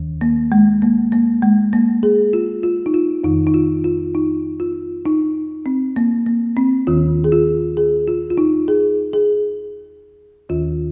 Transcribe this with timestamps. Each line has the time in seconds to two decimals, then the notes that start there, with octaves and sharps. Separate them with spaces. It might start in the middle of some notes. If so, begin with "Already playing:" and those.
Already playing: D#2 D#3
0.21 A#3
0.52 G#3
0.82 A#3
1.12 A#3
1.42 G#3
1.73 A#3
2.03 G#4
2.33 F4
2.63 F4
2.86 D#4
2.94 F4
3.24 F2 D#3 D#4
3.47 D#4
3.54 F4
3.84 F4
4.15 D#4
4.60 F4
5.06 D#4
5.66 C4
5.96 A#3
6.26 A#3
6.57 C4
6.87 D#2 D#3 F4
7.24 G#4
7.32 F4
7.77 G#4
8.08 F4
8.31 F4
8.38 D#4
8.68 G#4
9.13 G#4
10.49 D#2 D#3 F4